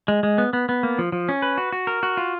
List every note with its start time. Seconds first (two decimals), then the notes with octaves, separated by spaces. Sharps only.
0.08 G#3
0.23 G#3
0.38 B3
0.53 B3
0.69 B3
0.83 A#3
0.99 F3
1.12 F3
1.29 C#4
1.42 B4
1.58 F#4
1.72 F#4
1.87 A#4
2.03 F#4
2.17 F4